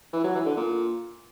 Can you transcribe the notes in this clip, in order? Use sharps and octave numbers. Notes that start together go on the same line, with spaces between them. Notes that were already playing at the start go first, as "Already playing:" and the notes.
E3
F#3
E3
D3
A#2